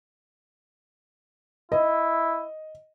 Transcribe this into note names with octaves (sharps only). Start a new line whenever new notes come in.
E4 D#5